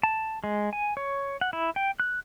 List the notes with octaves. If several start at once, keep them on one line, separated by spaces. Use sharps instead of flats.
A5
G#3
G#5
C#5
F#5
E4
G5
F#6